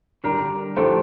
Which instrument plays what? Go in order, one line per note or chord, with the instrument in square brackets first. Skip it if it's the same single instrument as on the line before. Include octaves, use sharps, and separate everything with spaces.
[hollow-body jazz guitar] D3 G3 D4 [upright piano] A#4
[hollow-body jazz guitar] G2 F3 A3 D4 G4 [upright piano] A4 C5